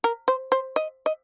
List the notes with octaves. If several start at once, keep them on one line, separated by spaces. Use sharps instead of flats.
A#4
C5
C5
D#5
D#5